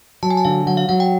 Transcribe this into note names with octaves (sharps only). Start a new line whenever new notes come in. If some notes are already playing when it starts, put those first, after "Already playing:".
F#3 A5
G#5
A5
D3 F5
F#3 F#5
F5
F#3 F#5
G5